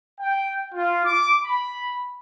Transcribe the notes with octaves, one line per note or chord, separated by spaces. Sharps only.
G5
F4
D6
B5